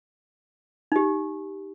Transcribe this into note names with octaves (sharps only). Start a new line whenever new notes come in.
D#4 G4